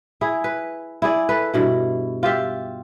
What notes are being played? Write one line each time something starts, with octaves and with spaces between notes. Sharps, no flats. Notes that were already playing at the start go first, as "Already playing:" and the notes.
E4 G#4
B4
E4 G#4 D5
A4 B4
G2 B2 E4
F4 G4 E5